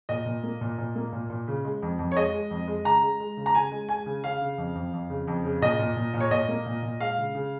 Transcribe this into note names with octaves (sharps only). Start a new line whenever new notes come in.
A#2 D#5
A#2
A#3
A#2
A#2
A#3
A#2
A#2
C#3
G#3
F2
F2
C#5
G#3 D#5
G#3
F2
G#3
C#3 A#5
G#3
G#3
C#3
A#5
C#3 G#5
G#3
G#3 G#5
C#3
C#3 F5
C#3
F2
F2
F2
C#3
F2
C#3
A#2 D#5
A#2
A#2
A#2
C#5
A#2 D#5
A#3
A#2
A#2
G#3 F5
C#3
C#3